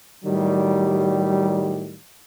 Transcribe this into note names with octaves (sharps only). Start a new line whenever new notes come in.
A2 D#3 F#3 G3